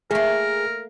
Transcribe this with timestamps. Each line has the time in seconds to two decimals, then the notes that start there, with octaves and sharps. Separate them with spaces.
0.11 A3 A#3 G#4 A#4